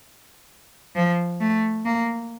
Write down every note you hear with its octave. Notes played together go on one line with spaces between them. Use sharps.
F3
A3
A#3